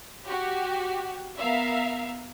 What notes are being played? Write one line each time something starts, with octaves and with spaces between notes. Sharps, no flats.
F#4 G4
B3 A#4 E5 F5